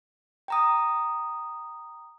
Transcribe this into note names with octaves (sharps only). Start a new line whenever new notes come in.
G5 A#5 D#6